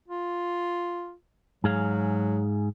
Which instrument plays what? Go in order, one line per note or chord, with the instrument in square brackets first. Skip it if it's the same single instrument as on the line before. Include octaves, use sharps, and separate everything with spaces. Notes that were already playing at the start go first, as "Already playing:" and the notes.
[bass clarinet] F4
[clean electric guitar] G#2 G#4 F5 [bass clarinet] F#3